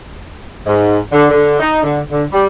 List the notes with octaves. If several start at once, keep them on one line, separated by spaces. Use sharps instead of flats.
G#2
D3
D3
D#4
D3
D3
G3